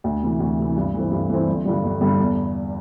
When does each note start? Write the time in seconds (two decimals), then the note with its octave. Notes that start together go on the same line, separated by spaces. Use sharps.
0.04 D2
0.23 C3 E3
0.40 D2
0.59 C3 E3
0.76 G2
0.94 E3 A3 C4
1.11 G2
1.30 E3 A3 C4
1.48 G1
1.66 G2 D3 G3
1.84 G1
2.01 G2 D3 G3
2.19 E2